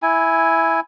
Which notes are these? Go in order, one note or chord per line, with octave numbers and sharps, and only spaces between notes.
E4 G#5